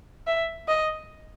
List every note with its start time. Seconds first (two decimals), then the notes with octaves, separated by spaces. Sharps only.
0.27 E5
0.68 D#5